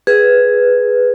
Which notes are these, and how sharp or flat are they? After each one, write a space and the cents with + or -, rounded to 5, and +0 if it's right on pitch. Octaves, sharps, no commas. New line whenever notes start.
G#4 +0 B4 +0